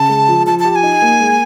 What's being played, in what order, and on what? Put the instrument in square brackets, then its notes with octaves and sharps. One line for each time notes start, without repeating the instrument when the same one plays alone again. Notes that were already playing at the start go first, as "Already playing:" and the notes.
Already playing: [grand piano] C#3 [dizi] A5
[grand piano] G#3
F3
[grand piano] F3 [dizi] A5
[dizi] A5
[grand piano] G4
[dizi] A5
G#5
[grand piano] D#4
A#3
G#3